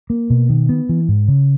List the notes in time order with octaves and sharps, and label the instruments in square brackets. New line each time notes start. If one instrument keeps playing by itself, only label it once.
[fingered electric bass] A#3
B2
D#3
B3
E3
G#2
C#3